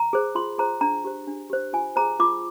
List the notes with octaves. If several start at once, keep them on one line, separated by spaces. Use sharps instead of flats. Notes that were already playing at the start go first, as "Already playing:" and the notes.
Already playing: A#5
G#4 C5
F4 C6
G#4 C5 A#5
D4 A#5
G4 C5
D4
G4 C5
F4 G#5
G#4 C5 A#5
F4 D6